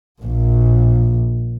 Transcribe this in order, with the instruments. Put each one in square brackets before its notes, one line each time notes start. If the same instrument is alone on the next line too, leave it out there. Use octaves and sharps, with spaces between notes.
[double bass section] A#1